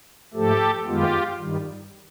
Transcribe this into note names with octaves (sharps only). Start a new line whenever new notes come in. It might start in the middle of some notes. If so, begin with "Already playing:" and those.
G#2 F3 A3 G4 A4
F#2 D#3 G#3 B3 F4 G4
G2 D#3 G3